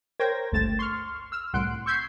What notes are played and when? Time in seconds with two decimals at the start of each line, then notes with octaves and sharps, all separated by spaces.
0.20 A#4 C5 C#5 G5 G#6 A#6
0.52 G1 C#2 A3 A6 E7
0.79 C6 C#6 F6
1.32 E6 F6
1.53 C2 A2 F#5 C6 F#6 D7
1.86 C#6 E6 G6 G#6 B6 C7